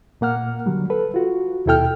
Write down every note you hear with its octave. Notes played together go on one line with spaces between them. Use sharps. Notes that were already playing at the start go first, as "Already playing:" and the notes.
A#2 A#3 F#5 F6
D3 F#3 G3
A4 B4
F4 F#4
D#2 B2 E4 A4 G5 F6